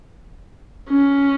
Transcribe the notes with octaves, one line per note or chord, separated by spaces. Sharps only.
C#4